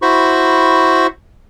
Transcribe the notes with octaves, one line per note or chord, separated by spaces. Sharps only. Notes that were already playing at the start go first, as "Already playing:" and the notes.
E4 F#4 C5 B5 C#6